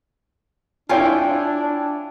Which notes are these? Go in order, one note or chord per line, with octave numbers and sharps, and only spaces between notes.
D4 E4 F4 C#5 G5 G#5